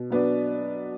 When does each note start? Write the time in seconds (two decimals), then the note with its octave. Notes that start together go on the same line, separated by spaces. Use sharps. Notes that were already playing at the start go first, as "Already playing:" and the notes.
Already playing: B2
0.10 F#3 B3 D4